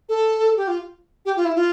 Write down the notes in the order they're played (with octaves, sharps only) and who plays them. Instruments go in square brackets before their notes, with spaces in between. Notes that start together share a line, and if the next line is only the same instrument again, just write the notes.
[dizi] A4
G4
F4
G4
F4
E4
F4